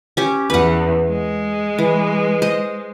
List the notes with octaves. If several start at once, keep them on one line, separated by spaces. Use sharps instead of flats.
C#4 G4
E2 B4 F#5
G#3
E3
C5 D#5